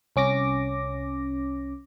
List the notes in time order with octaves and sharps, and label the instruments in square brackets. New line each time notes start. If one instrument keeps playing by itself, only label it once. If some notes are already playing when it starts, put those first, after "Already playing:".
[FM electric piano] C2 C#4 D6 A#6